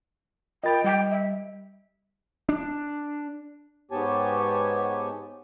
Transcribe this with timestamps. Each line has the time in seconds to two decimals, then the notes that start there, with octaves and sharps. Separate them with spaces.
0.64 F4 A#4 D#5 G5 B5 A6
0.84 G3 D#5 G5
1.10 E5
2.49 D4
3.91 G#2 B3 G4 C#5 G#5 A5